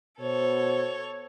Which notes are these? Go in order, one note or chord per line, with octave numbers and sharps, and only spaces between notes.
B2 A4 C5 C#5